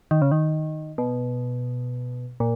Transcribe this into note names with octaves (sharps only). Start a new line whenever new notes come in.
D#3
C#3
D#3
B2
A#2